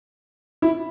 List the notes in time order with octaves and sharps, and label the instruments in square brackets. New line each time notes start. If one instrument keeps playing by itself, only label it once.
[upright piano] E4